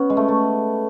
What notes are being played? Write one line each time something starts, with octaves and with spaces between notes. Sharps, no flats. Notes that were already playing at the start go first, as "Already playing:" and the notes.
Already playing: B3 C#4
G#3
A3
A3